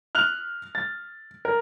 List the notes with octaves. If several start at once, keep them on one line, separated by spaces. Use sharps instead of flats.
F6 F#6 F7
A6
A#4